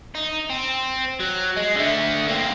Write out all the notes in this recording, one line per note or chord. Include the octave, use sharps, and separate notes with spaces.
D#4
C4
F#3
G#3
D3 A3
A#3 C4